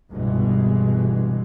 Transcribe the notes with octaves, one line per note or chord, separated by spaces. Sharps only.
G1 C2 B2 D3 E3 G#3